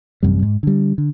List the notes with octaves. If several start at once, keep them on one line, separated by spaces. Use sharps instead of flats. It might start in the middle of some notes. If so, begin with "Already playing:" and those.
A1 F#2 C3 G3
G#2
D3 G3
D3